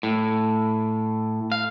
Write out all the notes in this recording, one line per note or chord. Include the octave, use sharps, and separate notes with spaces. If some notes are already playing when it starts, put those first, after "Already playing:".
A2
F5